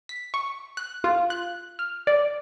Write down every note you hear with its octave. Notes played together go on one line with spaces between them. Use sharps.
B6
C#6
F#6
F4
F#6
F6
D5